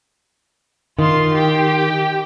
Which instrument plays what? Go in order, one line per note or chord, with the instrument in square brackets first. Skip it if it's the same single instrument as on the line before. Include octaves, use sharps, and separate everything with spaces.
[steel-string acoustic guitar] D#3 [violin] F4 C6
[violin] G4 G5